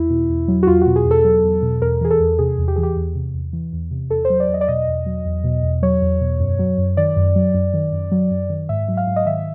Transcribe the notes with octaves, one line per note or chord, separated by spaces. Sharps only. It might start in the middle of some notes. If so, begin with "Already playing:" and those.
Already playing: E2 E4
B2
E2
F#3
F#4
E2 F4
F#4
B2
G#4
E2
A4
F#3
E2
B2
E2 A#4
E3 G#4
A4
E2
C3 G#4
E2
G4
E3 G#4
G4
E2
C3
E2
E3
E2
C3
E2 A4
C5
F#3
D5
E2
D#5
D5
B2 D#5
E2
F#3
E2
B2
E2
F#3 C#5
E2
B2
F#2
F#3
F#2
D#3 D5
F#2
F#3
F#2
D#3
F#2
F#3
F#2
D#3
G#2 E5
F#3
F5
G#2
D#5
D#3 E5